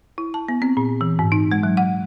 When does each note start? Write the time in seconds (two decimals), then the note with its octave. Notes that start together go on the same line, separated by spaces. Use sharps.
0.18 E4
0.34 A5
0.48 B3
0.62 C4
0.77 A#2
1.01 E3
1.19 G#2
1.32 D#4
1.52 G#3
1.63 F#3
1.77 F#5